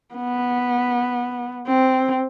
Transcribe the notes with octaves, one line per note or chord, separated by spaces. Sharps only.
B3
C4